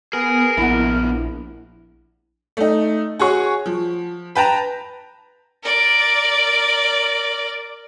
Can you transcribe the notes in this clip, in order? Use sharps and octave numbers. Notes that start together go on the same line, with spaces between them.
B3 G#4 A#4 G#5
A#1 F3 B3 E4 F#5
A3 D#4
F#4 G#4 C#5 C#6
F3
B4 G5 A5 A#5
A#4 D5